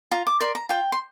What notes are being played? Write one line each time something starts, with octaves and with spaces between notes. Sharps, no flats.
F4 A#5
D6
A#4 D5 C6
A#5
F4 G5
C6